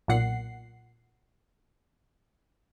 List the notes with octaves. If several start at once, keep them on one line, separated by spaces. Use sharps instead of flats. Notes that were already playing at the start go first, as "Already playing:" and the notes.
B1 A#2 F#5 C7